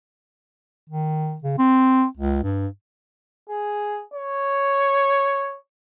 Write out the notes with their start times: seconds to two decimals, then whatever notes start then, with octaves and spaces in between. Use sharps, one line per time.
0.90 D#3
1.44 C#3
1.58 C4
2.17 C#2
2.44 G2
3.49 G#4
4.14 C#5